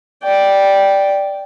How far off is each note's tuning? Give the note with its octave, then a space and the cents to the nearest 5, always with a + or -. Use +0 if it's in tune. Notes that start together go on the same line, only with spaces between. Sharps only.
D5 +0 G5 +0